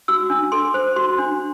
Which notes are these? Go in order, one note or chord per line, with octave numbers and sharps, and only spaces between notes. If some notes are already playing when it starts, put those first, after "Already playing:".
F#4 E6
D4
A4 C6
C5
F#4 C6
D4